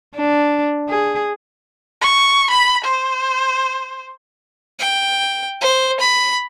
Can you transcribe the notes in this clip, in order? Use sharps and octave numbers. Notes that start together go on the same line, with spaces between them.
D4
G#4
C#6
B5
C5
G5
C5
B5